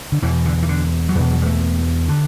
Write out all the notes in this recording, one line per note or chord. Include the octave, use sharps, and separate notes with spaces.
D3
E2 B2 E3
D3
E3
D3
F#3
E2 B2 E3
F#3
G3
A3
D3